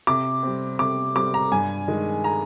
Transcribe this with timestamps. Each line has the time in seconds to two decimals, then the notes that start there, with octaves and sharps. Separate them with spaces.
0.07 C3 D6
0.43 G3 C4
0.79 C3 D6
1.15 G3 C4 D6
1.34 A#5
1.52 G2 G#5
1.88 D#3 G#3
2.24 A#5